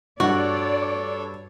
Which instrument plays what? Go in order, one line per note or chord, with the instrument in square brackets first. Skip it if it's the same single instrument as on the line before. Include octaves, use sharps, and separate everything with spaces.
[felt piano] G2 [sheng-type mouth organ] D4 A4 C#5 [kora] F#4 [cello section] D5